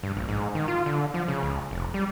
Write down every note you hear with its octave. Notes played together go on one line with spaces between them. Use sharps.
G2
A#1
G#2
D#3
F4
D3
F3
C#3
C#2
F1
G3